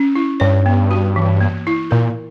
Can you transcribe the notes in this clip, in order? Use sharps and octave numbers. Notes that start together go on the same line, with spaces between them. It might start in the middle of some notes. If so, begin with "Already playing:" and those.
Already playing: C#4
E4
G2 C#5
B3
F#4
E3
A#3
E4
A#2 A#4